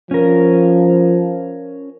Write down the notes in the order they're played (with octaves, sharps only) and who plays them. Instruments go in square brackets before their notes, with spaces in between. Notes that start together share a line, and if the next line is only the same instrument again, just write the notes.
[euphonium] F3 [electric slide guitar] C#4 A#4